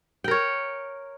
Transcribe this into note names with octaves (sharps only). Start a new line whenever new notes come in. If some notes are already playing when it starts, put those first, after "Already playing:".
A#4 C#5 G5